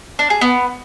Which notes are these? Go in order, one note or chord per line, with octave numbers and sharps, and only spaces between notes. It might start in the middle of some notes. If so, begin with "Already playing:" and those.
D4
G#4
B3